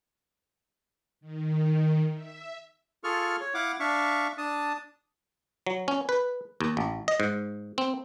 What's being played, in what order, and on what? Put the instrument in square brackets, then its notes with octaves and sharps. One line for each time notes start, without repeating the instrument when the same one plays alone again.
[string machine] D#3
E5
[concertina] F4 G#4 A4 C#6 F6
C#5
E4 F5 F#5 D6
D4 E5 F5 C#6
D4 A5 D#6
[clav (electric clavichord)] F#3
C#4
B4
D#2
A1
D#5
G#2
C4